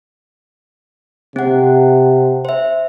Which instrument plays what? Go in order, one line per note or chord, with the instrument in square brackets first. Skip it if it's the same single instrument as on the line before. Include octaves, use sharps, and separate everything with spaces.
[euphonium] C3 [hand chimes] C4 F#5
[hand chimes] C5 E5